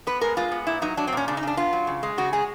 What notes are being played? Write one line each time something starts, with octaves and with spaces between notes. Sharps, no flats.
B3 B4
G#3 A#4
G#3 F4
B3
A#2 E4
F#3 D#4
F#3 D4
C4
A#2 C#4
C#3 D4
D#4
C#3 D4
B3 F4
F#3
C#3
G#3
C#3 F#4
G#3 G#4